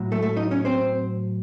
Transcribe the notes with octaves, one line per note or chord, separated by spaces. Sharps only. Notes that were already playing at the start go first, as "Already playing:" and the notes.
Already playing: A2 F#3
A3 A4
A3 A4
D#4 D#5
C#4 C#5
C4 C5